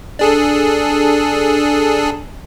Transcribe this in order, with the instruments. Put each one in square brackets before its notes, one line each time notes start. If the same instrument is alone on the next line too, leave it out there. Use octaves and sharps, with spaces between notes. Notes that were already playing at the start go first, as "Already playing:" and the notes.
[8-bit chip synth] D4 G#4 A4